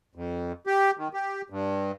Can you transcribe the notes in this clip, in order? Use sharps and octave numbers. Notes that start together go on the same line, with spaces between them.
F2
G4
D#3
G4
G2